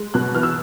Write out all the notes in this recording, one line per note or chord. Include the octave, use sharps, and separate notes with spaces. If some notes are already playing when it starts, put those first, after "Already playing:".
Already playing: G#3
B2 F#6
E3 F6
E6